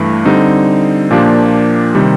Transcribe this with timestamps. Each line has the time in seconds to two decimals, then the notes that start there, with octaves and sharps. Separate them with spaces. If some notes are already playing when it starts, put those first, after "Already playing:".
Already playing: G2 E3 A3
0.25 D3 G3 C4 D#4
1.11 A#2 F3 A#3 D4 G4
1.95 C3 D#3 G3